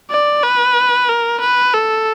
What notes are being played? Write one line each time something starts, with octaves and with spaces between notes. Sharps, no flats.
D5
B4
A#4
B4
A4